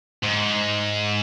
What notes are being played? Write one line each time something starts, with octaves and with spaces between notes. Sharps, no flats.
G#2